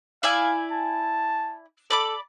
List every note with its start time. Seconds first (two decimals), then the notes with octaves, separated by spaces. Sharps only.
0.23 E4 D5 F5 G#5
0.71 A5
1.90 A4 D5 B5 D6